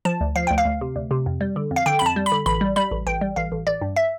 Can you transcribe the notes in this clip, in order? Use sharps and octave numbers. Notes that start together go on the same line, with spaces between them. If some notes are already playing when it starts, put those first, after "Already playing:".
F3 A5
D2
F3 F5
D2 G5
F5
D2
C3
D2
C3
F2
G3
D3
F2
F5
D3 G5
B5
F2 A5
G3
B5
D3
A1 B5
G3
G3 B5
A1
A1 G5
G3
A1 F5
A1
A1 D5
G2
E5